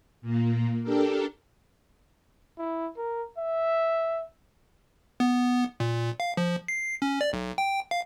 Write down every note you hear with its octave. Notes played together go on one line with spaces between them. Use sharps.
A#2 A#3
D4 G4 A4 A#4
E4
A#4
E5
B3
A#2
F5
F3
C7
C#4
D5
B1
G5
F5